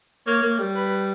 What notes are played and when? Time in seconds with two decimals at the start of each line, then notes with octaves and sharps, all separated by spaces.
0.27 A#3 C#5
0.42 A#3
0.59 G3
0.76 B4